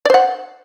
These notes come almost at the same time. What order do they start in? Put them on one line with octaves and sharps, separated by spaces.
D5 C5 F#5